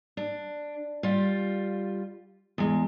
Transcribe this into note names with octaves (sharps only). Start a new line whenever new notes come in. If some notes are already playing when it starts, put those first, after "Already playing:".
D4
G3 F4
E2 G#3